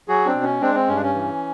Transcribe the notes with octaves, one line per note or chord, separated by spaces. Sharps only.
F#3 F#4 G#4
C4 D4
B2
C#4
G#3 C4 D4
C4
G2 C#4
D4
C#4
E3